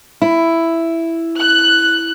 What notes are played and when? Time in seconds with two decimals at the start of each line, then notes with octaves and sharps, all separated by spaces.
0.22 E4
1.38 F#6